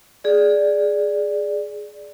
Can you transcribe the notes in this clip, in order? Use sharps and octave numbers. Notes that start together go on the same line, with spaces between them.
G#4 D5